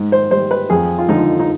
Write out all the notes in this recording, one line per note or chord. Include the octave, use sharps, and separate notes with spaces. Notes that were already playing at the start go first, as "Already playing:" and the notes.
Already playing: G#2
C5
G3 C5
B4
F2 G#4
F4
D3 F3 G#3 D#4
D#4